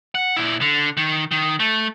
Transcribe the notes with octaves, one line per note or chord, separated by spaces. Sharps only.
F#5
A#2 E4
D3
D#3
D#3
A3